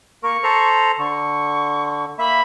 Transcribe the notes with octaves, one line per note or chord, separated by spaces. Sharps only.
A#3 A#4 C#6
A4 C5 A#5
D3 C#6
A#3 E5 B5